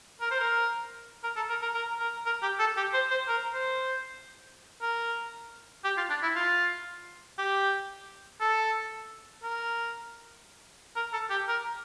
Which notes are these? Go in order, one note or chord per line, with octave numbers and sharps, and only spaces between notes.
A#4
C5
A#4
A#4
A4
A#4
A#4
A#4
A#4
A#4
G4
A4
G4
C5
C5
A#4
C5
A#4
G4
F4
D4
E4
F4
G4
A4
A#4
A#4
A4
G4
A#4